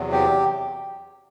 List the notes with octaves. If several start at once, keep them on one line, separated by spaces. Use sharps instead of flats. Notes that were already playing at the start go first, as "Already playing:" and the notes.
Already playing: E2 C3 F#3
G4